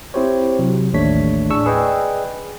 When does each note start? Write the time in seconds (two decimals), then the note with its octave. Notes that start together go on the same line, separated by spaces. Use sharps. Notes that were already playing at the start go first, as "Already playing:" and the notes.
0.14 C4 E4 G4 C5 C#5
0.59 C3 F#3
0.93 A1 D#2 A3 D4 C#5 B6
1.50 A2 D4 G#4 C#6 E6
1.66 G#4 B4 D5 D#5 G5 G#5